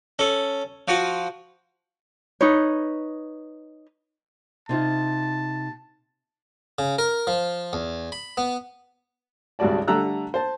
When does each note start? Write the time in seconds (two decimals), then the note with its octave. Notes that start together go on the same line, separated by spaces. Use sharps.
0.19 C#4 A4
0.88 F3 F4 F#4
2.41 D#4 B4 C#5
4.69 C3 D#4 F4 A5
6.79 C#3
6.98 A#4
7.27 F3
7.73 E2
8.12 B5
8.37 B3
9.59 G#1 C#2 G3 F#4 D5 A5
9.88 D3 G3 A3 A#5 E6 F#6
10.34 C5 A5